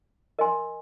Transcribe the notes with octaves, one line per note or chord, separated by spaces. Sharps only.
A#4 D#5 G#5 C6